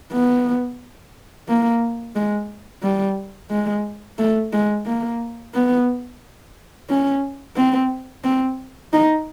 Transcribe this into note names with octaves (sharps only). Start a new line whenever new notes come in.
B3
A#3
G#3
G3
G#3
A3
G#3
A#3
B3
C#4
C4
C4
D#4